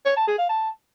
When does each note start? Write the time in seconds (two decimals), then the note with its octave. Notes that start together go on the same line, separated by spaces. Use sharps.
0.05 C#5
0.16 A5
0.27 G#4
0.38 F5
0.49 A5